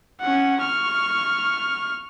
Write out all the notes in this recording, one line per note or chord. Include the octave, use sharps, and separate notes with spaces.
C#4 F#5
C#6 F6